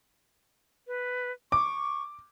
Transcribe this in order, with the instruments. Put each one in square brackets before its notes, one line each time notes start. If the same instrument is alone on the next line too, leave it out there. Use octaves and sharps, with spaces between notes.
[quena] B4
[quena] C#6 [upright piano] D6